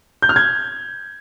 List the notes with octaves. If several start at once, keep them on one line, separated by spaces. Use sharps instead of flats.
G6
F6
G#6